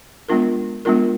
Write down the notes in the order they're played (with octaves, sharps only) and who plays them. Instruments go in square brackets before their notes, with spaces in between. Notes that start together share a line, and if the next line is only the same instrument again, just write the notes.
[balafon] G#3 B3 D4 F4 A#4
G#3 B3 D4 F4 A#4